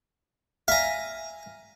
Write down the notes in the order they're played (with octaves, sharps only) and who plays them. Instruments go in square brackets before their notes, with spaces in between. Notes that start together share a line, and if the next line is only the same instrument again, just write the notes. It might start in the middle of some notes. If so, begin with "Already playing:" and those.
[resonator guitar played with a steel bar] E5 G#5 [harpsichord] F5 A#5